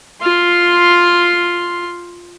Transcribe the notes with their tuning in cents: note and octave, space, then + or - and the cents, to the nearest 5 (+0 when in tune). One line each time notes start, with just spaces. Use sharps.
F4 +0 C6 +0